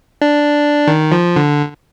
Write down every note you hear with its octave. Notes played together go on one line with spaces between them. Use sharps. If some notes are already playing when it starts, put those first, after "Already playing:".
D4
D#3
F3
D3